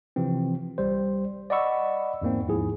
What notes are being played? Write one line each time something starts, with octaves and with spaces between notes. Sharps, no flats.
C3 E3 F3 C4
A#1 G3 C5
D5 D#5 F#5 B5 C#6 E6
E2 G#2 A#3 C4
D#2 G#2 F3 E4 G#4